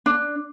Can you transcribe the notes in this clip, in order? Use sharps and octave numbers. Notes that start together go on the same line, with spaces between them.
D4